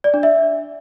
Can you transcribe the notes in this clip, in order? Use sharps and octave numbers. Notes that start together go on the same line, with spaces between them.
D5
D4
E5